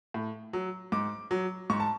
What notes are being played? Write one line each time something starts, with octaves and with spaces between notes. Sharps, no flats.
A2
F#3
G#2 D6
F#3
G#2 C#6
A5